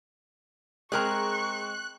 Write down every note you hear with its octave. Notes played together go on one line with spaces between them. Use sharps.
G#3 C4 G#4 A#4 A#5 C#6 F#6